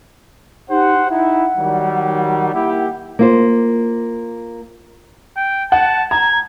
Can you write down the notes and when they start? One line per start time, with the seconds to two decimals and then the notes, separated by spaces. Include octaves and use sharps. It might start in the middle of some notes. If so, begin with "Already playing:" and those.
0.70 D#4 G4 C5 F#5
1.09 D#4 E4 F#5
1.57 D#3 F#3 G3
2.53 A#3 E4 G4
3.19 A#3 F4 C5
5.37 G5
5.72 F#5 A5
6.11 A#5 G#6